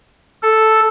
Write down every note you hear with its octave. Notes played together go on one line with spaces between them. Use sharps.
A4